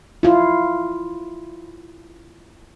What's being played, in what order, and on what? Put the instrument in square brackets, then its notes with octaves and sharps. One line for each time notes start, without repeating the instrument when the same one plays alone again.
[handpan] E4 F4